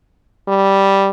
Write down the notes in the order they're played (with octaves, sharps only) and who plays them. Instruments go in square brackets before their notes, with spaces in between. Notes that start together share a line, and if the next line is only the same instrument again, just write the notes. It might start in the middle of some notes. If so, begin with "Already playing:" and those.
[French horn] G3